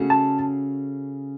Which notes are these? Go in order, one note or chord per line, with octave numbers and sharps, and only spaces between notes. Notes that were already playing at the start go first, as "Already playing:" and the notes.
Already playing: C#3 A3 C#4 F#4
A5